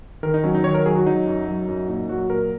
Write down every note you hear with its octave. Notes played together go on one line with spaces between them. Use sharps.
D#3 A#4
D#4
F#3 C#4
D#4
D#3 C#5
A#4
F#3 G#4
F#4
F#3 D#4
F#2
F#3
F#2
A#2 D#4
F#3 F#4
A#2 A#4